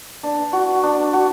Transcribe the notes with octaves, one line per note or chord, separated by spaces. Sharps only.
D4
F#4
D4
F#4